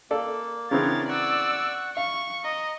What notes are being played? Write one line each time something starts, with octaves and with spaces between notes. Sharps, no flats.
A#3 A4 D5
C#3 E3 B3 C4 D4 A#4 C#5 A6
D5 F#5 C#6 E6
F5 C#6
D#5 A#5